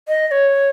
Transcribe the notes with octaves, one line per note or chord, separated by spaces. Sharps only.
D#5
D#5
C#5